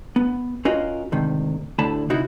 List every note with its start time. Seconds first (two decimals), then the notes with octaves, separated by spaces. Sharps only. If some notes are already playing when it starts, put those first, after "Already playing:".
0.16 B3
0.65 C#4 F4 F#4 A#4 D#5
1.12 D2 G#2 C3 D#3
1.79 D2 A2 D3 A5 B5
2.10 C3 D#4 E4 F#4